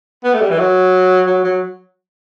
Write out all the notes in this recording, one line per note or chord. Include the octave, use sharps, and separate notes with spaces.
B3
A3
G3
E3
F#3
F#3
F#3